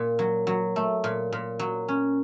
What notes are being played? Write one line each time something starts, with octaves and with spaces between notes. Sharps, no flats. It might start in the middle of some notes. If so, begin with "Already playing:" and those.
Already playing: A#2
F#3
F#3
A3
A#2
A#2
F#3
C#4